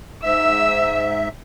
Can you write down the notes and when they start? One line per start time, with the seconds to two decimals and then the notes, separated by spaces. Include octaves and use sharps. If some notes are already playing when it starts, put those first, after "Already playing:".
0.23 G#2 E5 E6